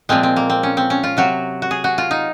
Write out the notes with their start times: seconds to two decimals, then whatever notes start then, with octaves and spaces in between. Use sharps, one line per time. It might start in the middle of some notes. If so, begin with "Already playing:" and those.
0.09 A#2 F3 G#3 C4
0.23 C4
0.36 A#3
0.50 C4
0.63 C#4
0.77 C4
0.90 C#4
1.03 F4
1.17 C3 F#3 F#4
1.62 F#4
1.71 G#4
1.84 F#4
1.98 F4
2.11 D#4